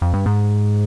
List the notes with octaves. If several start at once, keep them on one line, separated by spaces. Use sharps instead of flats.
F2
G2
G#2